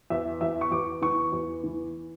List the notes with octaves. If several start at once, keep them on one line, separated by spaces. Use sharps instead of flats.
E2 E5
E2 E5
C#6
E2 D6
E3 C#6
E2
E3